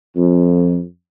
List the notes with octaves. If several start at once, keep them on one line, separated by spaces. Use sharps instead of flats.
F2